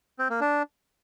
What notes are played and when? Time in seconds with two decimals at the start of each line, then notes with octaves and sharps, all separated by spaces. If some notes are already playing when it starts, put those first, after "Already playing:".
0.19 C4
0.30 A#3
0.41 D4